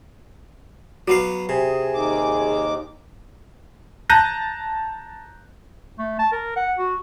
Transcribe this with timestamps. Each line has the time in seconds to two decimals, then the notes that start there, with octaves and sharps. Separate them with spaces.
1.08 F#3 B3 F#4 F5
1.49 C3 G#4
1.94 D#2 D#3 D6
4.10 A5 A#5 F#6 G6 A#6 D#7
5.99 A3
6.19 A5
6.32 A#4
6.56 F#5
6.78 F#4